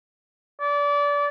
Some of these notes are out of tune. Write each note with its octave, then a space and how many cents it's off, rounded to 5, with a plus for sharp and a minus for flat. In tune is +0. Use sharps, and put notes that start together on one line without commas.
D5 -25